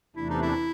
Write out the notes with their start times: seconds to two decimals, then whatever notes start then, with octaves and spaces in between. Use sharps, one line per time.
0.16 E2 C3 E3 A3 D4 E4
0.30 D#4
0.42 E4